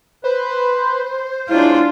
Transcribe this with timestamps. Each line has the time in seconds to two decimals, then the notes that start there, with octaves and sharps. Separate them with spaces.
0.24 B4 C5
1.49 F#3 G#3 D4 E4 F4